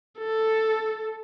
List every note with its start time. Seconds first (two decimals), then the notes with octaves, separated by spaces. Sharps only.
0.19 A4